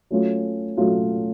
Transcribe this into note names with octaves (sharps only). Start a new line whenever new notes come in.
F#3 A3 C#4 F4
F#3 A3 C#4 F4